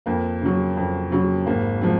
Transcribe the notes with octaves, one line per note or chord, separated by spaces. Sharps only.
F2 A#3
C#3 F#3
F2
C#3 F#3
G#1 A#3
F3 G#3 C4